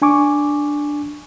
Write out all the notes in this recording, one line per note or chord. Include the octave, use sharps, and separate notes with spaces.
D4 G#5 C#6 D6